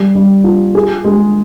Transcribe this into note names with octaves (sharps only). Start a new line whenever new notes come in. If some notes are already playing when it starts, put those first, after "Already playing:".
Already playing: G3
G3
F4
G#4
G#3